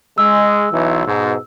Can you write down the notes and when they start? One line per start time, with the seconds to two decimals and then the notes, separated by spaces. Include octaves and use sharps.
0.18 G#3 E6
0.72 B1 E3
1.06 G#2 B2